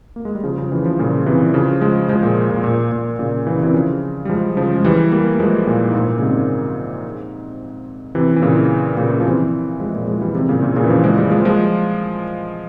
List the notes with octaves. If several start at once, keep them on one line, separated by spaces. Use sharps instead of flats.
A#3
G#3
G3
C#3 F3
C#3 F3
E3 G3
C#3 F3
A#2 C#3
C3 E3
C#3 F3
F3 G#3
F3 G#3
A#2
A#2
A#2
A#2
A#2 C#3
E3
C#3
C3 E3
C#3 F3
G3
F3 G#3
C#3 F3
G#3
E3 G3
G3 A#3
A#3
F3 G#3
A#2
G#2
A#2
C#3
G#2 C3
C3 E3
E3
A#2 C#3
A#2 C#3
F3
C3 E3
F3 G#3
A#2
F3 G#3
E3 G3
C3 E3
A#2 C#3
A#2
A#2 C#3
E3
C#3 F3
F3 G#3
G3 A#3
F3 G#3
F3 G#3